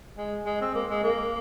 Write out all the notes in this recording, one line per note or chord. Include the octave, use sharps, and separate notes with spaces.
G#3
G#3
C4
A#3
G#3
A#3